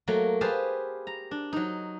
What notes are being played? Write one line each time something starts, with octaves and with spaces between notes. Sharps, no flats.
F#3 A3 A#3
G4 G#4 B4 C5 F5 A5
A#5
D4
F#3 D#4